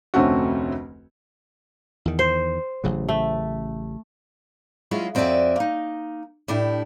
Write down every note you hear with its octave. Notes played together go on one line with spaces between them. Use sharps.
F1 D2 A3 C4 C#4 F#4
E2 D#3
C5
A1 C#3 F#3
A3
F#3 G#3 C#4 E4 F4
F2 C4 F#4 D5 E5 G#5
A#3 D#4
A2 D4 E4 G4